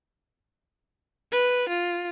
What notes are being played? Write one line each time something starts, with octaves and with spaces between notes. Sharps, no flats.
B4
F4